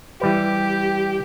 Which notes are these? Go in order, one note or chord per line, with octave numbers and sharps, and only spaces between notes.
E3 G3 G4 B4